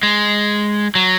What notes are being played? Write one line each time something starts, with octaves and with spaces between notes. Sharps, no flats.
G#3
F#3